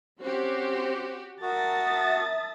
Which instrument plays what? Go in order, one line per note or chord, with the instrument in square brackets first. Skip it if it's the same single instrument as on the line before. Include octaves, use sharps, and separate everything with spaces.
[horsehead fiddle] C4 C5 [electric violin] C#4 [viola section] F#4 G4
[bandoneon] F#4 [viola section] A#4 [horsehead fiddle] E5 A5 [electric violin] D#6 A6